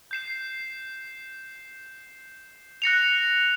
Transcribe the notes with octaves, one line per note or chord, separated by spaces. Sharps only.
G6 C7 E7
F#6 A#6 C#7 F7